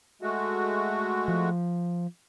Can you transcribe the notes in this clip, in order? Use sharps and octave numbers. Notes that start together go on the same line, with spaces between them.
G#3 A3 F#4
F3